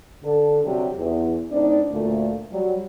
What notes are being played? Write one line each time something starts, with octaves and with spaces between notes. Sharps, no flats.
D3 A4
C3 F#3 G3 D4 G4
E2
A2 C4 D4 D#4 D5
D2 A#2 A3
F#3 G3